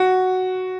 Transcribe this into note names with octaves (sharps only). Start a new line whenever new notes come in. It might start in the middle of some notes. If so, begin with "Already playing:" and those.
Already playing: F#4